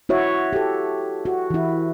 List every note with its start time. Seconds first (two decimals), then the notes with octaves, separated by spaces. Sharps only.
0.09 E4 F#4 C#5 E5
0.53 G4 A4
1.25 F#4
1.50 E3 E4